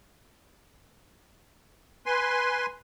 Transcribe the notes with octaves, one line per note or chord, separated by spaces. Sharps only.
B4 G#5 C6